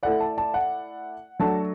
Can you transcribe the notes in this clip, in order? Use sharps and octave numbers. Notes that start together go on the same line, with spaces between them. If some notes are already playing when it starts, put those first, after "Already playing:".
A3 E4 A4 D5 F#5
A5
A5
F#5
F#3 A3 D4 F#4 A4 A5